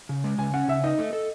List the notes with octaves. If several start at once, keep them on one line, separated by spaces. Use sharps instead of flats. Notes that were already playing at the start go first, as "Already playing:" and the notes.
C#3
G#3
C#3 G#5
C#4 F#5
C#3 E5
D#4 D#5
A3
A4